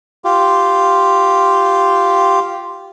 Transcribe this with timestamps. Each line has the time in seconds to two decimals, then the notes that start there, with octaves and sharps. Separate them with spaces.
0.25 F4 G4